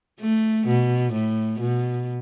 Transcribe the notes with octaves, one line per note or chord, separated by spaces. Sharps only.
A3
B2
A2
B2